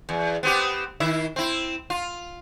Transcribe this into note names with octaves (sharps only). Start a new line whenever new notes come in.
E2
B3 C4 G4
D#3 E4 E5
C4 E4
F4